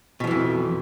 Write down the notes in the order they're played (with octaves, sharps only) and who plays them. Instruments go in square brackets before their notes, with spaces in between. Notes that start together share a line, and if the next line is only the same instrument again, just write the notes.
[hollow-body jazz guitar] B2
F3
E3
F2